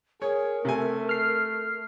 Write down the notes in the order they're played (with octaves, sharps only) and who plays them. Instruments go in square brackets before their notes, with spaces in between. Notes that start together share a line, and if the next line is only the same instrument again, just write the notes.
[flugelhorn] G#4 [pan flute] A#4 [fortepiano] C#5
[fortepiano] C3 G#5 [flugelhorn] A3
[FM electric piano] F6 C7